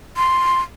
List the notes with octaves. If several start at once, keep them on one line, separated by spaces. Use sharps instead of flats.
C6